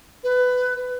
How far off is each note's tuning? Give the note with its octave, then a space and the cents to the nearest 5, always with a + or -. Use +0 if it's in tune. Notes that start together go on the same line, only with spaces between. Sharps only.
B4 +20